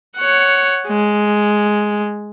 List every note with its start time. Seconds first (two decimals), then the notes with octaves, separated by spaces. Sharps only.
0.17 C#5 F#5
0.87 G#3